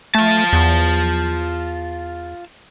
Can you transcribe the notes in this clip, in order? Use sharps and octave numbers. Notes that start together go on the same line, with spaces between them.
A3 F4 A5
E2